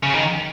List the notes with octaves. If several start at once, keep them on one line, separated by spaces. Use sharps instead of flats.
C#3
D#3